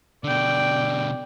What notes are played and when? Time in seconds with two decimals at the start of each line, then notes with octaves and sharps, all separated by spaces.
0.24 B2 D3 D5 G5